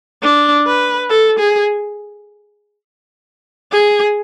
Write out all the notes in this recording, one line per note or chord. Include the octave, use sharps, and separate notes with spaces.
D4
B4
A4
G#4
G#4